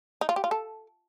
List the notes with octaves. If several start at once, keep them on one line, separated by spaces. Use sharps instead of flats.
D#4
F4
G4
F4
A4